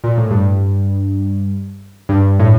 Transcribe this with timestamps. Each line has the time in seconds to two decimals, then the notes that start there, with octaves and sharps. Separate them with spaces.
0.04 A#2
0.17 A2
0.31 G2
2.09 G2
2.39 A2